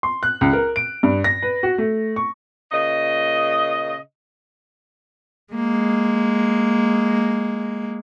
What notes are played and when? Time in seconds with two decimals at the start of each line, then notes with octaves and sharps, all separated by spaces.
0.03 C6
0.23 F#6
0.41 C#2
0.53 A#4
0.76 D7
1.03 G2
1.24 A#6
1.43 B4
1.63 F#4
1.78 A3
2.16 C#6
2.72 A#2 C#3 D#5
5.53 G#3 A#3